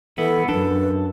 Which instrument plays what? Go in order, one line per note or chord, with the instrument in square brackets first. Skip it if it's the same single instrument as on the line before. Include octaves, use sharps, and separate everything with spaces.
[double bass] E3 [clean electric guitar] B3 E4 [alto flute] A4
[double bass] F#2 [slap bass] D4 [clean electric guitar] A4 [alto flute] B4